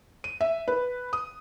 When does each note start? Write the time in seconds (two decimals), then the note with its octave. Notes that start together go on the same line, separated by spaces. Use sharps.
0.24 D#7
0.41 E5
0.68 B4
1.13 D#6